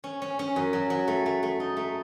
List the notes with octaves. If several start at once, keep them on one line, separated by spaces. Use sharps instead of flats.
C#4
C#4
C#4
F#2
F#3
F#3
A3
A3
A3
D#4
A3